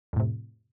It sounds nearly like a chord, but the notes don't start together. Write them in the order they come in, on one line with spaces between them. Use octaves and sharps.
F2 A2 C3